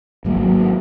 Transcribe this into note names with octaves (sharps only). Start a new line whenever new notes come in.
G#1 F#3 A#3